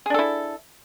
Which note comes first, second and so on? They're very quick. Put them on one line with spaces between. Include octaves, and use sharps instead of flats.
G#4 D4 A4 E4